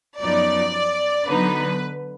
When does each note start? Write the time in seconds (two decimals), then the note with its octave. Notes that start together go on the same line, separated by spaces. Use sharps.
0.20 F#2 F3 B3 D#4 D5
1.28 D3 F#3 B3 D#4 B4